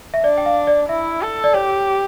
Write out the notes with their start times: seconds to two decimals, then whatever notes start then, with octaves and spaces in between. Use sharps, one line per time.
0.14 E5
0.23 D4 D5
0.38 G5
0.46 F5
0.67 D5
0.89 E4 E5
1.22 A4
1.44 D5
1.54 G4 C#5